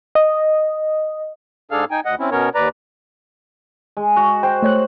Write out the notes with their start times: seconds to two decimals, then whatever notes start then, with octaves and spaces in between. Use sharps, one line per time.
0.15 D#5
1.71 G#2 D4 G#4 A4 F5 F6
1.91 D#4 G5 G#5
2.05 D2 D#5 F#5
2.19 C4 C#4 E4
2.31 B2 B3 C#4 A#4 C#5
2.55 D#2 B4 D5 A#5
3.97 G#3
4.16 F#4
4.43 C5 G5
4.63 A3 C#5 F#6